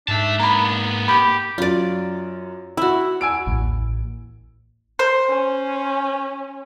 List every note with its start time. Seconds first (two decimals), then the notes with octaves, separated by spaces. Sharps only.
0.08 G#2 D4 E5 A5
0.40 A#3 B3 A#5 B5
1.08 G4 B5
1.58 F#2 F4 D5
2.77 E4 F#4 E6
3.21 G#5 E6 D7
3.47 A1 D#2
4.99 C5
5.29 C#4